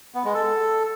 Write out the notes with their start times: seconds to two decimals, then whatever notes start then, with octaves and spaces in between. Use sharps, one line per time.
0.14 B3
0.24 G#3
0.34 A4